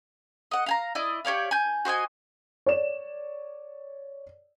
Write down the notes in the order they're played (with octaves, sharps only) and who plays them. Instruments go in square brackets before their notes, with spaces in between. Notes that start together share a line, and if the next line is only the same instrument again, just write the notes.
[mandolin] D#5 F#5
F5 G#5 A#5
E4 D5 D#5
G4 C#5 D5 F5
G#5 G6
F#4 C5 D#5 G#5
[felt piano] C#5 D5 E7